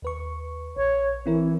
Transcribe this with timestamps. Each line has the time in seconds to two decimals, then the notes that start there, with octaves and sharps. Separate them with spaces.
0.02 D#2 B4 C#6
0.77 A#1 C#5
1.26 E3 C4 E4 A#4